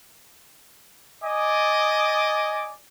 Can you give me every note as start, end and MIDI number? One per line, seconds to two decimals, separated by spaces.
1.24 2.74 74
1.24 2.74 75
1.24 2.74 80
1.24 2.74 86